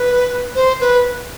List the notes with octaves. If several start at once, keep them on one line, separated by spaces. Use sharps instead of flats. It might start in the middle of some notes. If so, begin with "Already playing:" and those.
Already playing: B4
C5
B4